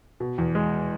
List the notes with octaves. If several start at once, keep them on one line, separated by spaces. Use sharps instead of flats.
B2
E2
G#3